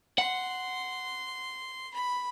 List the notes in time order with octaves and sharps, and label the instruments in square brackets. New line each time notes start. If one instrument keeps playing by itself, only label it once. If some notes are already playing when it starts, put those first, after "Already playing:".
[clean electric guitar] F#5 [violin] C6
[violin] B5